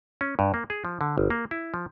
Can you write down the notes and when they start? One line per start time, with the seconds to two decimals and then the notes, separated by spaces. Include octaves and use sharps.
0.21 C#4
0.39 G2
0.54 A#3
0.70 G#4
0.85 F3
1.01 D3
1.18 G1
1.30 A#3
1.51 E4
1.74 F3